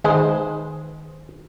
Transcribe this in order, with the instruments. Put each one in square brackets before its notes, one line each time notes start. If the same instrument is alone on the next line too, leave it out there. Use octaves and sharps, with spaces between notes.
[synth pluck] D#3 B4 C5 [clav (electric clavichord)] G#3 G#4